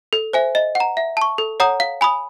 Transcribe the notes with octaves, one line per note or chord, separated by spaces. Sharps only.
A4
C5 E5 G#5
D#5
F#5
A#5
E5
A5 C#6
A4
C#5 F#5 A#5 D#6
F5
G#5 B5 D#6